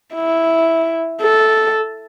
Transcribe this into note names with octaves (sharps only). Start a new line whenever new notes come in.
E4
A4